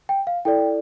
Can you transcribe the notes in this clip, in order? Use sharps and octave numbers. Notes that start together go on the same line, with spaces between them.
G5
F5
E4 A4 D5 G5